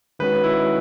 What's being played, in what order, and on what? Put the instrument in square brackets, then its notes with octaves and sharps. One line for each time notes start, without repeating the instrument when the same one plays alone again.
[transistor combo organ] D#3 G#3 C#4 F#4 [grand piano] B4
[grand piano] E4